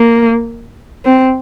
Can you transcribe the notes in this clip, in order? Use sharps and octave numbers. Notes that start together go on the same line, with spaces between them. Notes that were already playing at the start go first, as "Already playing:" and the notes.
Already playing: A#3
C4